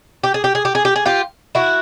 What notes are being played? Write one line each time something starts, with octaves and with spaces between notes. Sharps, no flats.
G4
G#4
G4
G#4
G4
G#4
G4
G#4
F4 G4
E4 F#4